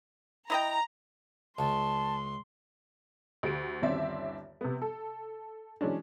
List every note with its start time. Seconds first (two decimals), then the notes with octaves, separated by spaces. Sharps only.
0.50 E4 D#5 G5 A#5
1.59 C#2 A5 C6
3.43 D2 G4 D7
3.82 G1 D#2 C4 C#4 D5 E5
4.61 C3 B3
4.82 A4
5.81 E3 F#3 G#3 C#4 D4